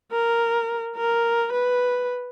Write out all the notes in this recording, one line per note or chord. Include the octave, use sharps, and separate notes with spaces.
A#4
A#4
B4